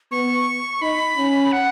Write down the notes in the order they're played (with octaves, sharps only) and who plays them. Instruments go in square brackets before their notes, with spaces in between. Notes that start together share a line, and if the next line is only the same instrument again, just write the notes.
[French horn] B3 [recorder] C#6
[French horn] D#4 [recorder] B5
[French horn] C#4
[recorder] F#5